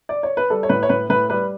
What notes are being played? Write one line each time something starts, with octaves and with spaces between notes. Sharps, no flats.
D5
C#5
B4
G3 A4
C#5
A2 B4
C#5
A2 B4
A2 B4
G3 B4